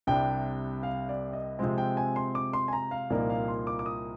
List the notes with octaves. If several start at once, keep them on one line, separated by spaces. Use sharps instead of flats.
C2 C3 G3 D4 G5
F5
D5
D#5
C3 F3 G#3 C4
G5
G#5
C6
D6
C6
G#5
A#5
F5
C2 A#2 F3 A#3 D#4 D5
F5
C6
D6
D6
D#6